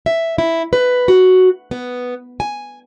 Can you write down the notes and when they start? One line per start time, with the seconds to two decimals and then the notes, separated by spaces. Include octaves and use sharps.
0.06 E5
0.38 E4
0.73 B4
1.08 F#4
1.71 B3
2.40 G#5